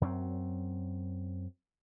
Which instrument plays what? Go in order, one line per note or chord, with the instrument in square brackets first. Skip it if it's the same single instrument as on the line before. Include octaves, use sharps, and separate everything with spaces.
[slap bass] F#2 F#3 B3 C4